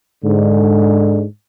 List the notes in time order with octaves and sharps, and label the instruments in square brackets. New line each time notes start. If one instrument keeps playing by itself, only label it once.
[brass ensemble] G#2 D3